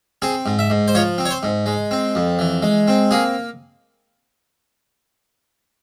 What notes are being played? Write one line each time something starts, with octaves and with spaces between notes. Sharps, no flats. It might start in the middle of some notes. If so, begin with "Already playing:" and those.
C4 G#4
G#2
E5
G#2
C5
F3 C#5
C4
C#5
C5
G#2
G#3
C4
F2
E3
G#3
C4
A#3 G#4